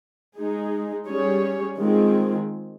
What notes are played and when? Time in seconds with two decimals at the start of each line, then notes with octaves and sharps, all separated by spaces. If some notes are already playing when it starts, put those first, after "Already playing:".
0.37 G#3 D#4 G#4
1.08 G3 C#4 G#4 C#5
1.79 D#3 G#3 C4 F4 G#4